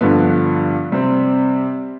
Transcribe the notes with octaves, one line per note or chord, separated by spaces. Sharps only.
G2 D3 F3 B3
C3 G3 C4